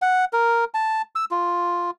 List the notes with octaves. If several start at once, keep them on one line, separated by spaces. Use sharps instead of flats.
F#5
A#4
A5
E6
F4